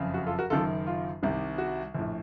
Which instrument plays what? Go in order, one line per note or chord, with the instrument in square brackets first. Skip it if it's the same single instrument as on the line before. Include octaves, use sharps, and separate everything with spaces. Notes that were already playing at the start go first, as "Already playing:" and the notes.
Already playing: [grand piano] F#1 F2 C#3
F#4
F4 A4
F#4 A#4
F#1 F#2 D#3 F4 A4
F4
C2 C3 D#3
F#4
A#1 A2